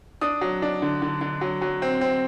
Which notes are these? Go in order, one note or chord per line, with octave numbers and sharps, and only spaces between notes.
D4 D#6
F#3
D4
D3
D3
D3
F#3
F#3
C4
C4